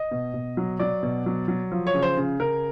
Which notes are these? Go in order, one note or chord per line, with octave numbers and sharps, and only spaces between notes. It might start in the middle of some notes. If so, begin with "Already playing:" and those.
Already playing: D#5
B2
B2
F#3
F#3 D5
B2
F#3
F#3
F3
C#5
C#3
C5
C#3
C#3 A#4